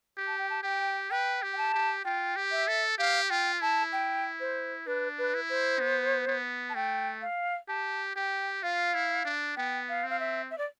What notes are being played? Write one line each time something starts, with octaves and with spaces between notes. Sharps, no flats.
G4
A5
G5
A5
G4 G5
B4 G5
G4
G5
A5
G4
F4 G5
G4
E5
A4
G4 F5
F4 G5
E4 A5
G5
C5
D4 B4
B4
E4
C5
B3
B3
A5
A3 G5
F5
G4 A5
G4 G5
F4 F5
E4
D4
B3 G5
F5
C4
F5
E5
E5
D5